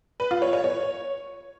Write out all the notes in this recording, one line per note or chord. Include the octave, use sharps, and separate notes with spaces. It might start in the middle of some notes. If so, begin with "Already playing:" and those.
B4
F4
C#5
C#5
C#5